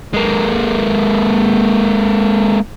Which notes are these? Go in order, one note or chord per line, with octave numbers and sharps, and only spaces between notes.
G#3 A#3